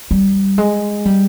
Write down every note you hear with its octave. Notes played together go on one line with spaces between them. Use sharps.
G3
G#3
G3